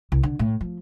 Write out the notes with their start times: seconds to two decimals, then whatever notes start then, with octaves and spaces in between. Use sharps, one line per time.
0.12 C2
0.23 D3
0.39 A2
0.61 F3